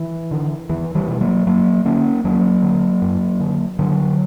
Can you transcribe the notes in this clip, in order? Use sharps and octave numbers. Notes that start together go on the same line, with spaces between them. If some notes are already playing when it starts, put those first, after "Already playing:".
Already playing: E3
D3
E2 E3
E3 G3
B2
F#3 A#3
F#2 F#3 A#3
D3 A#3 C#4
E2 F#3 A#3
D3
F#2
D3
G2 D3 F#3